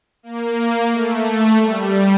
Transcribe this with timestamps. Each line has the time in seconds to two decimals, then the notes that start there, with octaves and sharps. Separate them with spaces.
0.23 A#3
0.91 A3
1.60 G3